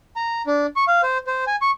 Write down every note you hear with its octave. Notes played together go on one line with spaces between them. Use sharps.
A#5
D4
C#6
F5
C5
C5
G#5
C#6